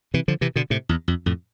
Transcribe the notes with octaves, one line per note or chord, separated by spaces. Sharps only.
C3 E3
D3 F3
C3 E3
B2 D3
A2 C3
E2
F2
F2 A2